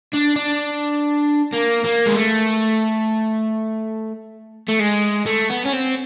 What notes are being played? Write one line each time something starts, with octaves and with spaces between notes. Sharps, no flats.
D4
D4
A#3
A#3
G#3
A3
A3
G#3
A3
B3
C#4
C4